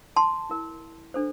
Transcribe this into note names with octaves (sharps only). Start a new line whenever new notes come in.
A5 C6
E4 A#4
D4 A4 C5